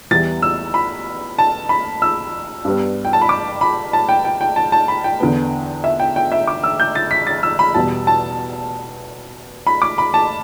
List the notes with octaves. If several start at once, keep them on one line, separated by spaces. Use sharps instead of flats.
E2 E3 G3 B3 A6
E6
B5
A5
B5
E6
G2 G3 B3
G5
A5
B5
D6
B5
A5
G5
G5
G5
A5
A5
B5
G5
E2 D3 B3
E5
G5
G5
E5
D6
E6
G6
A6
B6
A6
E6
B5
E2 B2 G3 A5
A5
B5
D6
B5
A5